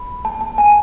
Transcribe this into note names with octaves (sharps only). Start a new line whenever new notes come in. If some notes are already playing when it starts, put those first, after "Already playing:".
Already playing: B5
A5
A5
G#5